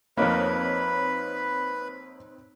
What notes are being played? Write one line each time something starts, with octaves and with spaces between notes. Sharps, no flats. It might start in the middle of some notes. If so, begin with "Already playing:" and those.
F2 A#3 C4 D#4 B4 C#5 B5